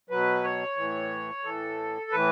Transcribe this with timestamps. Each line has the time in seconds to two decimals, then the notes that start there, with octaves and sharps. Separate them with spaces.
0.10 B2 F#3 B4
0.44 C#5
0.76 A2 E3
1.44 A2 E3 A4
2.11 A2 E3 B4